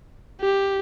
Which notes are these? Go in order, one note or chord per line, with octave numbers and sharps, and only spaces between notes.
G4